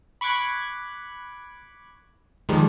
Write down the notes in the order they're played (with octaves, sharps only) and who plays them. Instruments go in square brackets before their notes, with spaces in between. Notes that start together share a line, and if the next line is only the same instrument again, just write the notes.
[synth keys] B5 C#6 D6 F#6 G#6
D#3 F3 G3 G#3